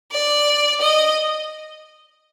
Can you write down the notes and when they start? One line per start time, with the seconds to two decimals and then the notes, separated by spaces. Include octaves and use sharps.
0.12 D5
0.81 D#5